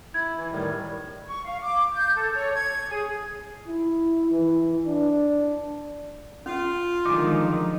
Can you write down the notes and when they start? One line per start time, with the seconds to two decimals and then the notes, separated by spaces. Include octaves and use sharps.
0.14 E4 G#6
0.37 E3
0.52 A2 D#3 G3
1.26 C#6
1.45 F5
1.62 D6
1.94 G6
2.16 A4
2.34 C#5
2.53 G#6
2.90 G#4
3.67 E4
4.31 E3
4.86 D4
6.46 C#4 F4
7.06 D3 D#3 F3 F#3 G#3 D#4 G#5 D6